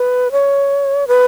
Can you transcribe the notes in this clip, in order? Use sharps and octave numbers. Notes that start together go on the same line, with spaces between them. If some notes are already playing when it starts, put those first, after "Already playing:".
Already playing: B4
C#5
B4